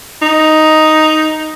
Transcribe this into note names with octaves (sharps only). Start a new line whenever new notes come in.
D#4